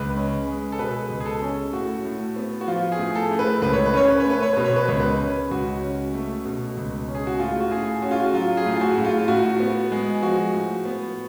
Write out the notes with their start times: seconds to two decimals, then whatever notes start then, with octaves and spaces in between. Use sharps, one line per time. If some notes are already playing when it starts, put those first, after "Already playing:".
Already playing: C#2 B4
0.16 C#4
0.47 G#3
0.72 A4
0.79 B2 B4
1.10 C#2
1.20 G#4
1.26 A4
1.42 C#4
1.73 A2 F#4
2.05 A2
2.36 B3
2.61 F#4
2.67 F3 F4
2.92 G#4
2.99 A2
3.16 A4
3.31 A2
3.39 B4
3.62 C#2 B4
3.73 C#5
3.86 B4
3.94 C#4 C#5
4.08 B4
4.20 C#5
4.25 A3
4.30 B4
4.42 C#5
4.53 B2 B4
4.65 C#5
4.76 B4
4.88 C#2 C#5
5.00 B4
5.20 C#4
5.51 C#2 F#4
5.83 C#4
6.14 A3
6.46 B2
6.77 C#2
7.08 C#4
7.15 G#4
7.27 F#4
7.39 A2 F4
7.60 F#4
7.71 A2 G#4
8.02 C#4 F#4
8.11 F4
8.20 F#4
8.33 F#3 F4
8.57 G#4
8.66 A2
8.75 F4
8.81 F#4
8.98 A2
9.05 F4
9.18 F4
9.28 A2 F#4
9.60 B3
9.92 G#3
10.22 F3 F#4
10.54 A2
10.85 B3